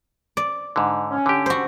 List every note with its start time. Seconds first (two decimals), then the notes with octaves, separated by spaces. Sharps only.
0.37 D5
0.76 G#2 D3
1.10 C#4
1.26 D3 G4
1.46 F#4 C5